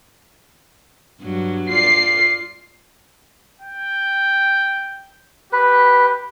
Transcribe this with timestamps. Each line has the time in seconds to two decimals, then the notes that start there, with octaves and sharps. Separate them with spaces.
1.21 G2 F#3
1.70 F4 D5 C7
3.62 G5
5.53 G4 B4